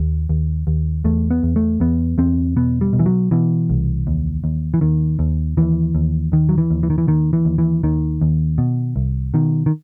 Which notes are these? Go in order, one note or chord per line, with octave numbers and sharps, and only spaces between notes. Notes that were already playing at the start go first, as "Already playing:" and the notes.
Already playing: D#2
D#2
D#2
E2 A3
B3
E2
A3
E2 B3
E2 C4
B2 B3
G3
B2
E3
F#3
B2 E3
C2
D#2
D#2
E3
D#2 D#3
D#2
D#2 E3
D#2
D#2 D#3
F#3
E3
D#2
E3
D#3
E3
D#2 D#3
E3
D#2
E3
D#2 D#3
D#2
B2
C2
B2 D#3
D#3